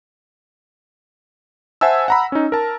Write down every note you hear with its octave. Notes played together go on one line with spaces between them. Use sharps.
C5 E5 F#5 G#5 A5 E6
F#5 A#5 B5
C#4 D#4
A#4 A5